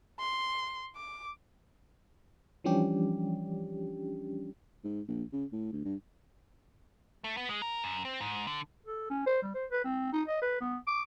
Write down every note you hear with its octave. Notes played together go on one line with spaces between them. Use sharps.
C6
D6
E3 F3 G3 C#4 D4 G4
G#2
A#1
C#3
A2
D2
G2
A3
B3
G#3
A#4
F#2
C4
G#2
D3
A4
C#4
C5
G3
C5
B4
C4
D#4
D#5
B4
B3
D6